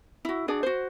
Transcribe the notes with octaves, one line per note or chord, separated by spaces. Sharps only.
E4 F#4
D4 F#4 G#4 D5
F#4 C5